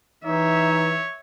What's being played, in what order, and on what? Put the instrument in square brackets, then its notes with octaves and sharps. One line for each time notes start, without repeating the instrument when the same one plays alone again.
[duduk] E3 [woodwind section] D#4 [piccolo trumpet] C#5 [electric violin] E5